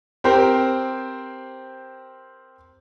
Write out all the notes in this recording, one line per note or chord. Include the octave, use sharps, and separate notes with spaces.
C4 G4 A#4 C5